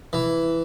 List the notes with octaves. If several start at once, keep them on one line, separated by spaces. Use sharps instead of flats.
E3